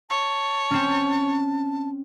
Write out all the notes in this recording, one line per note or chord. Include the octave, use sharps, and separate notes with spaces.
C#5 A5
C4 C#4